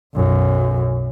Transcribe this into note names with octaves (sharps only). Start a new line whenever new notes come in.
B1 F#2